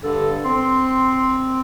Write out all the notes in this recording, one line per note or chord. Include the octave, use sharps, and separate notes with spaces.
G2 D3 A4
C4 C6